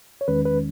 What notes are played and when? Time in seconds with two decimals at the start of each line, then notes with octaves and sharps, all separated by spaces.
0.21 C#5
0.28 E2 D#3 G#3 C#4 B4
0.45 B4